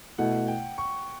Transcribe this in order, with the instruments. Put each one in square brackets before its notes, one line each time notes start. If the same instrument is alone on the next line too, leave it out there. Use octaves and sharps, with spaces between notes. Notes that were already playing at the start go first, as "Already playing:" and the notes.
[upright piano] B2 A3 E4 [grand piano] F#5
[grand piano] G5
C#6